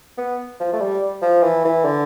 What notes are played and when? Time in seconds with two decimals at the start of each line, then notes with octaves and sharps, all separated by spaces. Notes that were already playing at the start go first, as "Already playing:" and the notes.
0.17 B3
0.60 F3
0.73 A3
0.80 G3
1.22 F3
1.43 E3
1.65 E3
1.85 D3